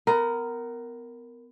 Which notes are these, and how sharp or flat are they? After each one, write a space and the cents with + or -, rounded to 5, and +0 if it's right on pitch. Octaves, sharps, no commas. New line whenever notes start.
B3 +25 A#4 +0